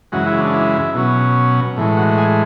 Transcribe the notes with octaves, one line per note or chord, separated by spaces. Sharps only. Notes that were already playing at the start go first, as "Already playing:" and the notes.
F#2 C#3 E3 G#3 F#4
E4
D4
E4
B2 F#3 C#4
A2 E3 G#3
F#4
G#4